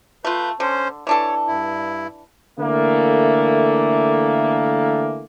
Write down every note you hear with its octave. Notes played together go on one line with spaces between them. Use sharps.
A3 F4 B4 G6
D3 C#4 C5
E3 D4 A4 C#5
G2 E4
D3 E3 A3 A#3